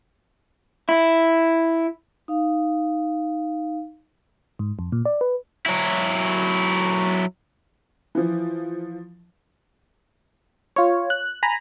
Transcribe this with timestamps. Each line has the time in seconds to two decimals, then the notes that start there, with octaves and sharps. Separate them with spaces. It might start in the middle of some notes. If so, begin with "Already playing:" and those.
0.89 E4
2.28 D#4 F5
4.59 G#2
4.79 F2
4.92 A#2
5.05 D5
5.21 B4
5.66 F#3 E4
8.15 E3 F3
10.76 F4 C#5
11.10 F#6
11.43 G#5 A#5 B5